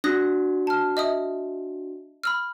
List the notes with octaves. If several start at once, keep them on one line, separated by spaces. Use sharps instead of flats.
D4 F#4 D#6 F#6 A#6
A5 F6
D#5 E5 D#6
B5 E6 F6